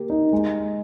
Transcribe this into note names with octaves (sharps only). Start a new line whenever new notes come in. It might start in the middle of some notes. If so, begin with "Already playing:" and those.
Already playing: A#3 G4
D#4
G#3